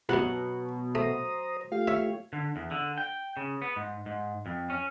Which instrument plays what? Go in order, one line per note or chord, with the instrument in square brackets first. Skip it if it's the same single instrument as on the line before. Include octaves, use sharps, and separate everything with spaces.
[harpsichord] C2 F#2 [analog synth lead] B2 [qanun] F#3 F#5
[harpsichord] A3 [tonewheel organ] C5 A#5 D#6
[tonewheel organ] A3 F4 G4 [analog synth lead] F5
[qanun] C#5 [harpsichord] E5
[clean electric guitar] D3
E2
D3
G5
C#3
B3
G#2
G#2
F2
C#4